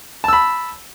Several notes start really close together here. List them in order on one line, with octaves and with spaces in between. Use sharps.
A5 E6 B5